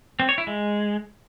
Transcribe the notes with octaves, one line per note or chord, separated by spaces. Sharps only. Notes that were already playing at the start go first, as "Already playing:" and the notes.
C4
C#5
E4
G#3